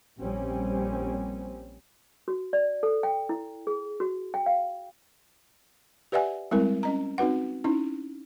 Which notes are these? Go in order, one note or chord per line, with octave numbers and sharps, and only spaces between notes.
A#1 G3 C4 C#4
F#4
D5
A4
G5
E4
G#4
F#4
G5
F5
G4 B4 D5 E5 F#5 G#5
G3 G#3 C4 E4 A#4
C#4 D#5 A#5
C4 D#4 F#4 B4 F#5
C#4 D#4 E4